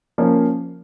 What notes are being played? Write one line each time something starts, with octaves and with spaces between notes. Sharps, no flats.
F3 A#3 C#4